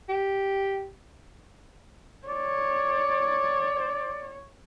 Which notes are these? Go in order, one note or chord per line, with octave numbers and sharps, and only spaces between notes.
G4
C#5 D5